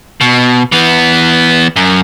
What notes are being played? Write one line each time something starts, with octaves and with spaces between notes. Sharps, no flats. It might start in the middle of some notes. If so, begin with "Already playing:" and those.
B2
E3 B3
F#2